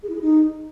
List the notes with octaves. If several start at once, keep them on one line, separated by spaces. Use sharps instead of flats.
G#4
E4
G#4
D#4